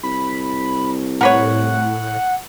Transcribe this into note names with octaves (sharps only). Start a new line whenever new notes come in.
C2 B5
A2 A#4 B4 C#5 F#5